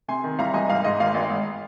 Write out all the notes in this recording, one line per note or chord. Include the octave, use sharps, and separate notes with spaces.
C3 G#5 C6
D#3
C2 F5 A#5
C2 D#5 G#5
G#1 F5
G#2 D#5
G#1 F5
G#1
G#1